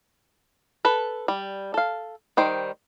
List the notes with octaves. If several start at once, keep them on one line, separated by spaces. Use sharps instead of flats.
A4 B4
G3
A4 F5
D#3 G3 C5